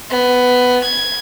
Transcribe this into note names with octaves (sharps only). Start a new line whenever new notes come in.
B3
G#6